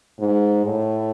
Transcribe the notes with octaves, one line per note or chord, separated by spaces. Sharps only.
G#2
A2